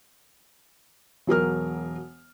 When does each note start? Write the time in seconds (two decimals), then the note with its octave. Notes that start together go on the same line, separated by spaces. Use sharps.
1.27 E1 F#3 A#4 F6